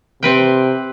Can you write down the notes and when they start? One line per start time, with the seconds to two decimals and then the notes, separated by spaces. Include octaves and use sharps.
0.23 C3 C4 B4 G5